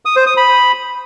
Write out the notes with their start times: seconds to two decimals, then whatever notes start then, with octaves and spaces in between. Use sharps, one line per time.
0.05 D#6
0.16 C5
0.27 D#6
0.37 B5